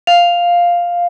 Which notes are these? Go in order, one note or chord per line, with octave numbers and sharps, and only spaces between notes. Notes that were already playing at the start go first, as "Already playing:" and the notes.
F5